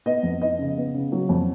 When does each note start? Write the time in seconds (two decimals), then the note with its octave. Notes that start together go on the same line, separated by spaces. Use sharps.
0.06 B3 D#5
0.23 F2
0.41 B3 D#5
0.59 C#3
0.77 B3
0.94 C#3
1.12 F#3
1.29 F2